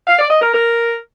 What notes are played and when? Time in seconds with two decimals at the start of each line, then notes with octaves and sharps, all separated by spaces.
0.06 F5
0.18 D5
0.29 D#5
0.41 A#4
0.52 A#4